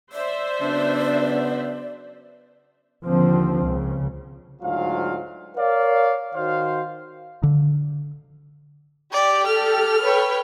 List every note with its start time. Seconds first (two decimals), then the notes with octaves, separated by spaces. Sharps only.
0.13 C5 D5 E5
0.61 C#3 F#3 B3 D4
3.05 D#2 D3 F3 C4
3.61 C#2 C#3
4.62 D2 G#2 F#3 F4 F5
5.57 A#4 C#5 D5 F5
6.34 D#3 F#4 C5 F5
7.43 D3
9.13 G4 D5
9.47 A4 F6
10.02 B4 C#5 G5